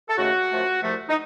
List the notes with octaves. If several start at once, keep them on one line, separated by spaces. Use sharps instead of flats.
A4
D#2 C#3 A3 F#4
F#2 F3 A3
C2 C3 F3 A3
D#4